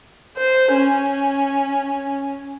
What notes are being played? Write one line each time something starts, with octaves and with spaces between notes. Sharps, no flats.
C5
C#4